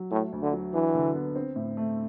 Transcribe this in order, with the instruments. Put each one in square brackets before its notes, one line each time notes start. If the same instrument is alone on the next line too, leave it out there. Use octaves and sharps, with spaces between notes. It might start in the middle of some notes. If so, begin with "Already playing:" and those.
Already playing: [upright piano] F#3
[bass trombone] A2 [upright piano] A3
[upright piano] D2
[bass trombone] D3
[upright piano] F#3
[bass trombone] E3 [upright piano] D4
[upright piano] D3
B3
C4
A2
A3